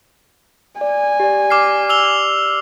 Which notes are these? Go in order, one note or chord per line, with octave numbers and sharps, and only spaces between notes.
D5 G#5
G4 D5
D6 F6 C7
E6 F7 G7